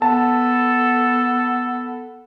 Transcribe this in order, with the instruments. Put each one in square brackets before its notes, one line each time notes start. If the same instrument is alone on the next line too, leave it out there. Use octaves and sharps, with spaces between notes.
[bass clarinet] B3 [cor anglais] A4 [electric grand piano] A5